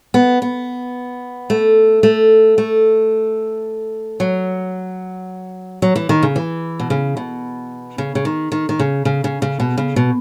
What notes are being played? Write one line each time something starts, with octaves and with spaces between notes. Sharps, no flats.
B3
B3
A3
A3
A3
F#3
F#3
E3
D#3
C#3
E3
B2
C#3
B2
C#3
C#3
D#3
D#3
D#3
C#3
C#3
C#3
C#3
B2
C#3
B2